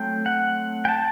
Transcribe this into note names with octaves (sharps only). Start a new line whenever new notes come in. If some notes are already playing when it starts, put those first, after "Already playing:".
Already playing: F#3 A3 C4 G5
F#5
G5
A5